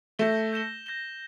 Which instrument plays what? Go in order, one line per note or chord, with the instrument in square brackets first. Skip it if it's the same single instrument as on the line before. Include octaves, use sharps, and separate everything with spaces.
[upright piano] A3 [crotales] G6 A#6 E7 G7
[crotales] G6 A#6 E7 G7
G6 A#6 E7 G7